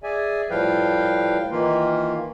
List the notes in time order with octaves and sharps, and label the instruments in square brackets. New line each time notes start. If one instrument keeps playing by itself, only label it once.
[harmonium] G#4 D5 E5 G#5
A2 F3 G3 B4 F5 G5
D#3 E3 A#3 F4